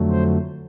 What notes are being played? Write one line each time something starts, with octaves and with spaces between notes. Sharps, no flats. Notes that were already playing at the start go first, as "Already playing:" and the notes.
Already playing: F2 D3 F#3 A3
C5